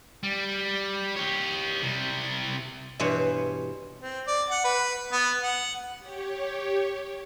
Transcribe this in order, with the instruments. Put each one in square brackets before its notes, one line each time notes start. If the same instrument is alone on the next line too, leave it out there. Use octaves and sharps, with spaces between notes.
[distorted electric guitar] G3
G4 C#5
C3 G3
[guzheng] G2 B2 E3 C5 C#5
[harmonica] C4
D5
F#5
B4
B3
F#5
[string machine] G4 C#5